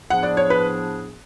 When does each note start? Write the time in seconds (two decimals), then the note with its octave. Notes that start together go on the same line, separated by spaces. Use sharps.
0.10 A2 F3 B3 D4 G#4 F#5
0.23 D5
0.37 C#5
0.50 B4